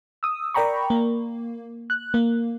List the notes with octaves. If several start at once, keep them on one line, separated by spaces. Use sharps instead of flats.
D#6 E6
A#4 D5 G5 A#5 B5 C#6
A#3
F#6
A#3